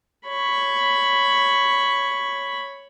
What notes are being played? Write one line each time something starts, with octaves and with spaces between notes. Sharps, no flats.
C#5 B5